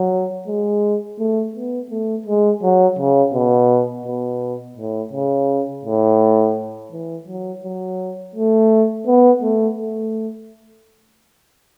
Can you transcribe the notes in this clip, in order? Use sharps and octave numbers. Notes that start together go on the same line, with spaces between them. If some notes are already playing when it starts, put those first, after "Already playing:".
Already playing: F#3
G#3
A3
B3
A3
G#3
F#3
C#3
B2
B2
A2
C#3
A2
E3
F#3
F#3
A3
B3
A3
A3